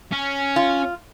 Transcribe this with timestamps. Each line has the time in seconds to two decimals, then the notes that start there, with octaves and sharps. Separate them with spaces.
0.12 C#4
0.56 F4